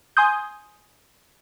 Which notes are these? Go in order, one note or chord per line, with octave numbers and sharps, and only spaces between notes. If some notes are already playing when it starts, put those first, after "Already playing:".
G#5 C6 D#6 G6